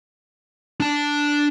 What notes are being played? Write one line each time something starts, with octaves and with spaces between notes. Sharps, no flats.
D4 A5